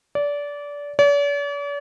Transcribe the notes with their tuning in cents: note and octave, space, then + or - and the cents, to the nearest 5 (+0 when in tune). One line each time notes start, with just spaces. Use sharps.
D5 -25
D5 -45